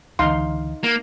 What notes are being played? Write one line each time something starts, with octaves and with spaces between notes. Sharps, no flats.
C#2 D3 E3 D#4 F5 C6
A#3